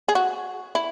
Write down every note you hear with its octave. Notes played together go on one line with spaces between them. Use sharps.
G#4
F#4
E4